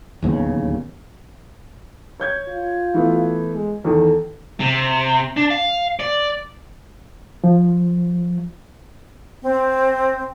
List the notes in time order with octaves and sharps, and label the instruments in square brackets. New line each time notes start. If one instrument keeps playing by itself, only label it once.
[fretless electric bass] D1 D#2 C#3 B3
[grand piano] C#5 G6 G#6
[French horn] F4
[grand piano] E3 A3 B3
[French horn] G#3
[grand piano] E2 D#3 [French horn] A4
[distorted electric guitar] C3
D4
F5
D5
[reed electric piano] F3
[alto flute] C4